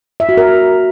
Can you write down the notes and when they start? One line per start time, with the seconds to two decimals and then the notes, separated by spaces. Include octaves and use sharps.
0.20 E5
0.29 F#4
0.37 A#4